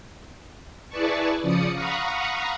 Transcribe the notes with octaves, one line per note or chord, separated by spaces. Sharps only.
E4 G#4 B4 D5 A5 C#6
C#3 F3 D5 D#6 C#7
F5 F#5 A#5 B5 C#6 D#6